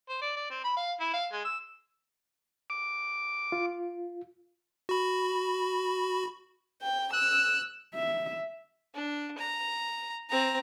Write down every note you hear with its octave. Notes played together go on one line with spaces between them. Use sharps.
C5
D5
D5
C4
B5
F5
E4
F5
G#3
E6
D6
F4
F#4 B5
G5
E6 F#6
E5
D4
A#5
C4 A#5